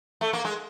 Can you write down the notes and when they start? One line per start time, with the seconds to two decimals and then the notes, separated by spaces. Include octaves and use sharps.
0.21 A3
0.33 A#3
0.45 G#3